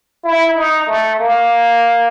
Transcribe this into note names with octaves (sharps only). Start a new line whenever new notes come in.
E4
D#4
A3
A#3